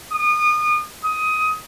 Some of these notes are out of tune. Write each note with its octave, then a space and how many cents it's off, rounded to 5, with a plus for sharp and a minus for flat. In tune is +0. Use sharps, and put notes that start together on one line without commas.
D#6 -30
D#6 +15